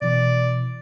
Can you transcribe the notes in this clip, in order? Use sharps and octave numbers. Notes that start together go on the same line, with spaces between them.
B2 E3 D5